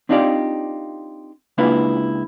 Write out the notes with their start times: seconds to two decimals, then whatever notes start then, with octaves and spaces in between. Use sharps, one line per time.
0.09 C4 D4 D#4 F4 G4 D5
1.58 C#2 A#3 D4 E4 F4 B4